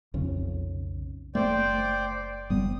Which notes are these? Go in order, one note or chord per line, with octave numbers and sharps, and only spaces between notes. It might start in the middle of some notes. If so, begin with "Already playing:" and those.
B1 F2 C#3
F#1 A3 C5 D5 G5
F#1 G3 B3 D#6